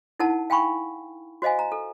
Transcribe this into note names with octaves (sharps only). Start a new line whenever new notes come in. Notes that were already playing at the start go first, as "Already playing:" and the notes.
D#4 E4 A#4 F#5 A5
F5 G5 G#5 B5 C#6
F#4 C5 D#5 F5 G#5
A#5
A4